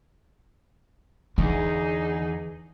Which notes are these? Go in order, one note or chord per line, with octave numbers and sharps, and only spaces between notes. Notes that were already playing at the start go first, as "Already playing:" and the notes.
E2 D3 D#4 G#4